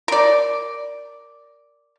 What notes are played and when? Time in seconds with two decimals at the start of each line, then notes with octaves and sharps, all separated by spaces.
0.08 A#4 D5